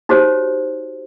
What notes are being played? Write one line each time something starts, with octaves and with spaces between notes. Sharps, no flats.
D#4 F#4 G4 C5 C#5